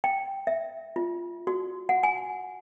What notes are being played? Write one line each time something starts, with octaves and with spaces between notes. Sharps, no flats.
G5
E5
F4
F#4
F#5
G#5